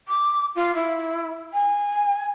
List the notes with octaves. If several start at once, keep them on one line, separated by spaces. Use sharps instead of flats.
D6
F4
E4
G#5